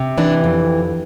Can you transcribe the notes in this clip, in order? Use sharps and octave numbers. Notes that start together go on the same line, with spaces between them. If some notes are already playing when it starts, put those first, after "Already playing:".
Already playing: C3
E3 D4
F2